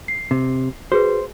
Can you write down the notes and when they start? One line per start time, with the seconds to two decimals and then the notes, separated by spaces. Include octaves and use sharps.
0.08 C7
0.31 C3
0.92 F#4 G#4 B4 C5